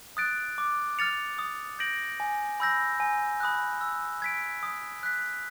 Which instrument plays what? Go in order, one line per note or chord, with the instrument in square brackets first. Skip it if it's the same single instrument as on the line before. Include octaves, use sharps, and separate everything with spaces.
[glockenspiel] D#6 F#6 A6 D7
D6
F6 A6 C#7 F7
D#6
G6 A#6 D7 F#7
G#5
B5 E6 G6 A#6
G#5
B5 D#6 F#6
E6
G#6 B6 D7
D#6
F#6 B6